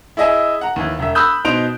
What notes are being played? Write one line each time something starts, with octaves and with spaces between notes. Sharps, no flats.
E4 G#4 D#5 E5 G#5
F#5 A#5
D#2 E3
E1 E5
B5 D#6 E6 F#6 G6
B2 D#4 C5 C6 D7 F7